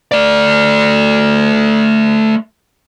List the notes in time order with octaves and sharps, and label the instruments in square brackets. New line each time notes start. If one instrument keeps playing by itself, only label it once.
[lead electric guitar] A3 D5